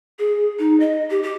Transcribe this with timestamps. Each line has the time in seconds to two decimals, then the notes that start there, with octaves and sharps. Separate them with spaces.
0.19 G#4
0.59 D#4
0.80 D#5
1.10 G4
1.23 G4